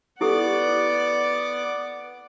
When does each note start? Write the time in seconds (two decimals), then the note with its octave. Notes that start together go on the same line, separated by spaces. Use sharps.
0.21 B3 E4 G4 A4 D5 F#5 D6